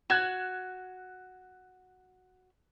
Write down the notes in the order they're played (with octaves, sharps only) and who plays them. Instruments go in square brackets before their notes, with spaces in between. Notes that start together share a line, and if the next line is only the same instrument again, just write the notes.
[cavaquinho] F#4 [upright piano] F#6 G#6 E7